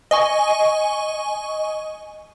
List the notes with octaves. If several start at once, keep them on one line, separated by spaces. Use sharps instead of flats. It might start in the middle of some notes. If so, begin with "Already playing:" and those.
D#5 G#5 C#6